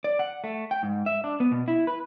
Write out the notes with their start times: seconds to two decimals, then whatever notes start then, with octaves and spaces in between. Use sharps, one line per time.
0.04 D5
0.19 F#5
0.44 A3
0.71 G5
0.83 G#2
1.06 E5
1.24 D4
1.40 B3
1.52 B2
1.68 E4
1.87 B4